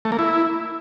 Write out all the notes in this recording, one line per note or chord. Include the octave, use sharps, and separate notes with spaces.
A3
A#3
E4